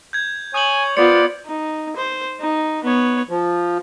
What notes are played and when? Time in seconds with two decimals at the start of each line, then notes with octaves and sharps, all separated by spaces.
0.13 G6 G#6
0.54 C#5 G#5 D#6 G6 F#7
0.97 B3 F4 C5 D5 C#7
1.46 D#4
1.96 C5
2.41 D#4
2.84 B3 C#5
3.29 F3